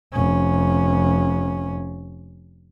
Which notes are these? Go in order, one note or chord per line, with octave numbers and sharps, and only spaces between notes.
F1 C#4